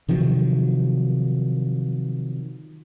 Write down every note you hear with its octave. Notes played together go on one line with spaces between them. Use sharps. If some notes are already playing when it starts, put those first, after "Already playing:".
C3 D#3 F3 F#3